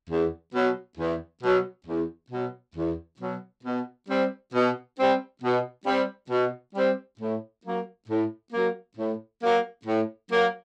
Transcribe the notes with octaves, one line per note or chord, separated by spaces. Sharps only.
E2
B2 F#3
E2
B2 F#3
E2
B2 F#3
E2
B2 F#3
B2
G3 C4
B2
G3 C4
B2
G3 C4
B2
G3 C4
A2
F#3 A#3
A2
F#3 A#3
A2
F#3 A#3
A2
F#3 A#3